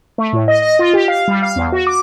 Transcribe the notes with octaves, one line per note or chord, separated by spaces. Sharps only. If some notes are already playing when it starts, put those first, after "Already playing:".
A3
A2
D#5
D#5
F4
G4
F5
G3
F5
E2
F#4
D6